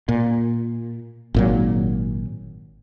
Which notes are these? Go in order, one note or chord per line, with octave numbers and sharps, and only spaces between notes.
A#2
G#1 A#2 F#3